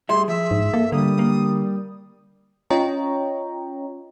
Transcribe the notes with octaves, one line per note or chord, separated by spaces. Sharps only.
A2 G3 G#4 E5 C6
F3 E5
G#2
A#3 A4
D3 G3 A#3 D#6
A#3
C#4 F4 C#5 D#5 G5 A#5